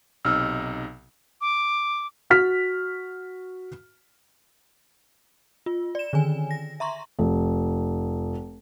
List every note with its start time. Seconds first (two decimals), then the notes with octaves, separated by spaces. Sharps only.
0.25 B1 C3 D#4 E6 F6
1.41 D6
2.30 F#4 F6 B6
5.66 F4
5.95 D5 E7
6.13 D3 D#3 G#5
6.51 A#6
6.80 E5 A#5 C6 C#6
7.19 F1